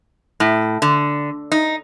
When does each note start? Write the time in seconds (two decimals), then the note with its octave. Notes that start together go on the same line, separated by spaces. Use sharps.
0.40 A2
0.82 D3
1.52 D#4